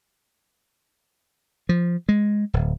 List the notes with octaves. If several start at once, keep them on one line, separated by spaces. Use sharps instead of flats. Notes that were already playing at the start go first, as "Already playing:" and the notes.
F3
G#3
D1